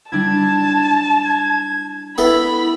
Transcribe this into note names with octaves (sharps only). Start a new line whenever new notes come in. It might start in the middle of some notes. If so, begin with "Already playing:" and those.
G3 D4 E4 A5 G#6
G#6
B3 E4 A4 E5 B5